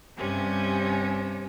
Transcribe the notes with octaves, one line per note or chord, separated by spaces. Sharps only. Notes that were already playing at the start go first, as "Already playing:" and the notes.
G2 C3 C#4